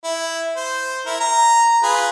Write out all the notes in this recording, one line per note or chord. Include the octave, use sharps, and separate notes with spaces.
E4
C5
E4 A#4
A#5
F4 G#4 B4